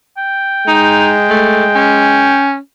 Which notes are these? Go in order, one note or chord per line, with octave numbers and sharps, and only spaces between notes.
G5
G#3 D#4
A3
C#4